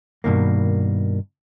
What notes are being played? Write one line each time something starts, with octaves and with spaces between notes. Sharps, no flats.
G2 B2 D#3 A#3